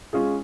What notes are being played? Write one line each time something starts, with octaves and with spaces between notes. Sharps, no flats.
G#3 C#4 F4 G#4